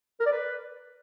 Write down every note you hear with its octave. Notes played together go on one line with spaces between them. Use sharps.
A#4
D5
B4